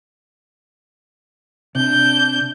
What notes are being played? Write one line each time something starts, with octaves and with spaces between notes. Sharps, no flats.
C3 D4 G6